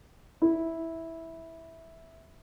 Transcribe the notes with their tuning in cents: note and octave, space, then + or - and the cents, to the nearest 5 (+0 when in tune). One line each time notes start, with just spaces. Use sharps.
E4 -10